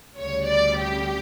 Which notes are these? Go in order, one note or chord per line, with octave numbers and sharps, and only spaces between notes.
D2 C#3 G3 C#5
D5
G4